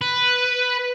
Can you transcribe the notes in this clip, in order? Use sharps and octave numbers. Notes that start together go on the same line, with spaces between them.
B4